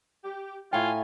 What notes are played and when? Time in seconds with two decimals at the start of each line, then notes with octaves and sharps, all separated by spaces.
0.24 G4
0.73 A2 F4 F5 G5 G#5